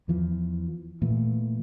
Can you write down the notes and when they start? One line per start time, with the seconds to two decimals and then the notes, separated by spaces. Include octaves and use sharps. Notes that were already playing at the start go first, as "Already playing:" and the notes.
0.08 E2 E3 F3
1.02 A#2 E3 A3